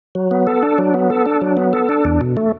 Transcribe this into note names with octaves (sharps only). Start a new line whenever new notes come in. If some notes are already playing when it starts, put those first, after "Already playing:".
F#3
B3
A4
D4
F#3
B3
A4
D4
F#3
B3
A4
D4
E2
B2
A3